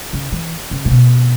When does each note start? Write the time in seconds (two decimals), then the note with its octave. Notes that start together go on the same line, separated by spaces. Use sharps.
0.13 C#3
0.32 E3
0.71 C#3
0.85 A#2
0.91 B2